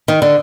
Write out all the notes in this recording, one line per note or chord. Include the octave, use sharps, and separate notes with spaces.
D#3
D3